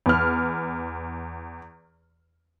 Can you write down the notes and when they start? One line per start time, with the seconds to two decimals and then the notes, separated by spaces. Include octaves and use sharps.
0.06 E2 F6